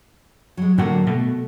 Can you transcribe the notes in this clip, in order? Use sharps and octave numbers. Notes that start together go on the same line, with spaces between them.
F#3 G#3
A2 D3 F#3 A#3 F#4
B2 A3